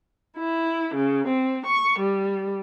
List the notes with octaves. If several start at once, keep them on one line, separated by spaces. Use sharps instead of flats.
E4
C#3
C4
C#6
G3